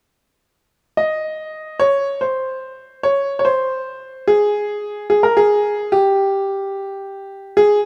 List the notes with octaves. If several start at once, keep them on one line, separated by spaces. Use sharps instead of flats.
D#5
C#5
C5
C#5
C#5
C5
G#4
G#4
A#4
G#4
G4
G#4